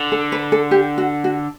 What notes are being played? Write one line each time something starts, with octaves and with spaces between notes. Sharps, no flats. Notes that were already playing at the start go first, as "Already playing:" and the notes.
Already playing: D3
A4
B4
A4
G4
F#4
F#4